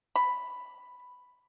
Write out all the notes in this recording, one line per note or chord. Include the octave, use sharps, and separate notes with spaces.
B5